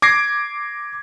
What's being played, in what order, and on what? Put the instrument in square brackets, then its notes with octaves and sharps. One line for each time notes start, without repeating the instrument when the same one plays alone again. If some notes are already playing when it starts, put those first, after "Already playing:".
[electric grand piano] D6 G#6 A#6 C7 D7